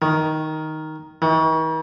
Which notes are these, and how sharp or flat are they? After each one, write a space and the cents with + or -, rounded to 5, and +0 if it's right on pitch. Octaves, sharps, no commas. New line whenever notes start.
D#3 +5
D#3 +45